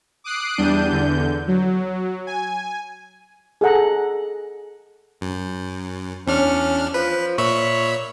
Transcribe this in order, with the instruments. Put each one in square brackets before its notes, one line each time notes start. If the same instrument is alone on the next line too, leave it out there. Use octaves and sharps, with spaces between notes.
[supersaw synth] D6 D#6 F#6 C7 D7
E2 G3 D4 G6 D#7
E2 D3 G6
F#3
G#5
[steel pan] G#4 A4 F#5 A#5
[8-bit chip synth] F#2
[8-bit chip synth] E2 D4 F6 [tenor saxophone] C#4
[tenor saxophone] F3 [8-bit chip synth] B4
[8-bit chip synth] A#2 E5 B5 [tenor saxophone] C#5